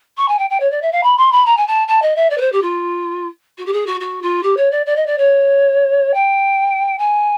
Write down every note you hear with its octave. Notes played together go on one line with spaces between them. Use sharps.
C#6
G#5
G5
G5
C#5
D5
E5
F5
B5
C6
B5
A#5
G#5
A5
A5
D#5
E5
D5
B4
C5
G4
F4
F#4
G4
G#4
F#4
F#4
F4
G4
C#5
D5
D5
D#5
D5
C#5
G5
G#5